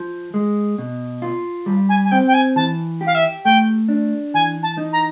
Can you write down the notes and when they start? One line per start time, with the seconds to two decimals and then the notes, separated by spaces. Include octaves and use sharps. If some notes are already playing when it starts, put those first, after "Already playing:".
Already playing: F3
0.34 G#3
0.78 B2
1.22 F4
1.66 G3
1.89 G#5
2.05 G#5
2.11 C4 G5
2.27 G5
2.34 G#5
2.56 E3 A5
3.01 G4
3.06 F5
3.15 E5
3.45 A3 G5
3.89 D4
4.34 E3 G#5
4.63 A5
4.77 D#4
4.93 A#5